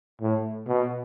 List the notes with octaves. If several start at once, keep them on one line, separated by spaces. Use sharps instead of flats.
A2
B2